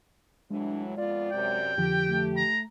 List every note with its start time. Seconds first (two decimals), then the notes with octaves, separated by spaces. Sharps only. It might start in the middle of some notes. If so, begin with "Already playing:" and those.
0.50 A2 E3 F#3 G#3 D4
0.97 F2 B3 F4 D5
1.32 F#2 C3 G5
1.77 F2 D3 F3 G4
2.08 A3
2.36 A#5